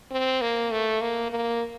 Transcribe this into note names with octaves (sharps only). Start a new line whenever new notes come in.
C4
A#3
A3
A#3
A#3